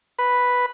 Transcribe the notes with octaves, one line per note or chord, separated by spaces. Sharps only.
B4